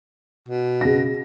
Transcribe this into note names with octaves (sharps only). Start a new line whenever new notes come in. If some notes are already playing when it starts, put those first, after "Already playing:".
B2
C#3 A#6